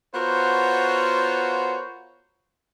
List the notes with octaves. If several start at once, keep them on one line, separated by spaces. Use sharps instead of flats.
B3 F4 F#4 A#4 C5 C#5